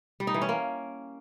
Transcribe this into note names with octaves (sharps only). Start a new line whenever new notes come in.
G3
D#4
E3
C#4
A#3